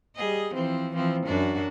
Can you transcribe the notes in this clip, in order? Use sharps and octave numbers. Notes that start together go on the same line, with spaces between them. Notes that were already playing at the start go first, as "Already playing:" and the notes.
G3 G#4 D#5
E3 F3 C4
E3 F3 C4
F#2 D4 F#4